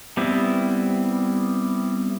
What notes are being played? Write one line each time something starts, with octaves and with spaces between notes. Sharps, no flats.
G3 B3 C4 E4